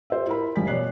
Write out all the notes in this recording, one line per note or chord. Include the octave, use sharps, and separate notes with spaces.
G4 C5 E5
E4 A#4 B5
F#1 F3 G3 G#5 B6
B2 C#5 D5 F#6 C7